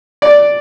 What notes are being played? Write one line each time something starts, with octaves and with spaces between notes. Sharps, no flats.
D5